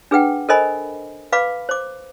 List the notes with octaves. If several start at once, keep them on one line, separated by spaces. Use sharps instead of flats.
D4 G#4 B4 F#5 G5
A4 A#4 C5 D#5 G#5 B5
B4 F5 B5 D6
C5 D6